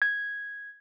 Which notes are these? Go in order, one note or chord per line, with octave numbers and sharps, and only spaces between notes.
G#6